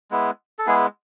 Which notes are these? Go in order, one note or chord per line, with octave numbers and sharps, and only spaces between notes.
G#3 B3 E4
A4
G#3 B3 E4 G#4